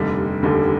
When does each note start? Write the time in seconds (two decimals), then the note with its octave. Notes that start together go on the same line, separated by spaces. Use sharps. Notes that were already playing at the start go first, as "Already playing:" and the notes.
Already playing: F1 D#2 D3 G3
0.43 F1 D#2 D3 G3